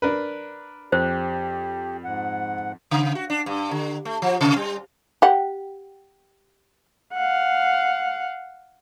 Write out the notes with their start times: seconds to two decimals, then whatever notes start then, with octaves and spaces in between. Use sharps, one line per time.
0.02 D4 A#4 B4
0.92 F2 G4 C5
2.04 G#2 F#5
2.91 C#3
3.15 F#4
3.30 D4
3.46 G2
3.71 D3
4.05 A3
4.22 F3
4.41 C3
4.56 G3
5.22 G4 F#5
7.15 F5 F#5